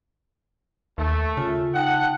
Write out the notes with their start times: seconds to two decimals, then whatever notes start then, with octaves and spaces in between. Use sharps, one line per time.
0.98 D#2 A3
1.37 C#3 F4
1.74 D#4 F#5 G5 A5